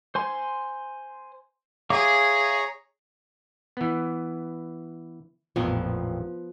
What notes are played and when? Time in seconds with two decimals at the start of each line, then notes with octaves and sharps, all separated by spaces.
0.15 C5 G#5 C6
1.90 G#4 C#5 E5 F5 A#5 D6
3.77 E3 B3
5.56 A1 F2 A#2 F3 B3